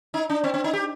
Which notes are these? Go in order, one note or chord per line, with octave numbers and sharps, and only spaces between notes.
D#4
D4
C4
C4
D#4
G4